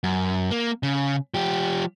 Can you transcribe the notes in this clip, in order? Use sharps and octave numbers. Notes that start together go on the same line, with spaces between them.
F#2
A#3
C#3
F3 G4